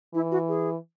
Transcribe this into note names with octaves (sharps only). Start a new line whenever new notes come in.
E3 E4
F#4
G#4